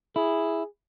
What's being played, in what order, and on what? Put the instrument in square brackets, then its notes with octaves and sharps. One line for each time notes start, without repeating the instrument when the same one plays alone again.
[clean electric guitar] E4 [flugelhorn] G#4